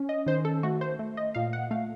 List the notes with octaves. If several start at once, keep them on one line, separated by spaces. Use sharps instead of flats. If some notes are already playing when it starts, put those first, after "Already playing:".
Already playing: C#4
D#5
D#3 C5
A4
A3 F#4
C5
A3
D#5
A#2 F5
F#5
A3 F5